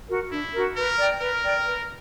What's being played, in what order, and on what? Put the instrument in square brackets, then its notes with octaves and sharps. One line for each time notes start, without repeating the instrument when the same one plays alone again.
[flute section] F#4 A#4
[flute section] D4 [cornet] E4
[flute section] F#4 A#4
[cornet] A#4 [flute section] B4
[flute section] D5 G5
[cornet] A#4 [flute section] B4
[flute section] D5 G5
B4